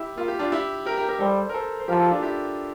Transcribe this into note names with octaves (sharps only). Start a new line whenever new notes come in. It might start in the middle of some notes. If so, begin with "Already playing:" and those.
Already playing: E4 G4
A#3 F4
G4
D4 F4
E4 G4
G4 A#4
G4 A#4
G4 A#4
G3 A4 C5
A#4
A4 C5
C5
F3 G4 A#4
F4 A4
G4
D4 F4
E4 G4